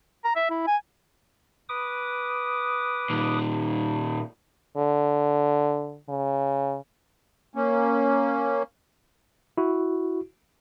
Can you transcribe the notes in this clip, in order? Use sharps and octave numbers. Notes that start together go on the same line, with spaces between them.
A#5
E5
E4
G#5
B4 D6 D#6
A#2 D#3
D3
C#3
A#3 C#4
E4 F#4